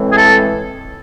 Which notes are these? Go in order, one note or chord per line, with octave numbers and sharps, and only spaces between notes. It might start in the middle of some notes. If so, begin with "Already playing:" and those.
Already playing: A2 E3 G#3 C4
G#4
A4